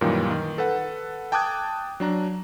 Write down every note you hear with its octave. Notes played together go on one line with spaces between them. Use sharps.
F#2 A#2 D#3 E3 G3 A#3
D#3
A4 B4 F#5
G5 A5 D6 D#6 F#6 G#6
F#3 D4 A#5